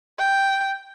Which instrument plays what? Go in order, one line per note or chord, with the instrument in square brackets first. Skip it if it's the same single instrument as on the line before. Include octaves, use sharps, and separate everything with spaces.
[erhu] G5